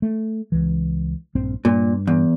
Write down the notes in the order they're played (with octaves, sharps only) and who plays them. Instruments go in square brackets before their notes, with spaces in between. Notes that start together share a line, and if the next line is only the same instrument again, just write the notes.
[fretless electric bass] A3
C#2 E3
A#1 G2 C4
[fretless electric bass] G2 [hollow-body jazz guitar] A#2
[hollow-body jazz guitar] E2